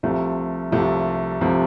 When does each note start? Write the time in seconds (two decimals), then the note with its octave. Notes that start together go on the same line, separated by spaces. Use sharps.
0.03 C2 C3 F3 A3
0.72 C2 C3 F3 A3
1.41 C2 C3 F3 A3